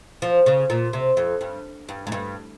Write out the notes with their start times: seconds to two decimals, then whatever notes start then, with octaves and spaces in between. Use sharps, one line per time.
0.22 F3
0.46 C#3
0.70 A#2
0.93 C3
1.17 F2
1.41 G2
1.89 G2
2.07 G#2
2.12 G2